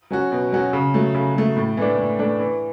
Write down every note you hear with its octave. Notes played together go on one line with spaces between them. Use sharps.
F#3 C#4 F#4
B2
F#3 C#4 F#4
C#3
F#3 A3
C#3
F#3 A3
A2
E3 A3 D4
A2
E3 A3 D4
E3